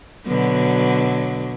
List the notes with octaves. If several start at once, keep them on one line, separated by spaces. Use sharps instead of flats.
B2 D3 F#3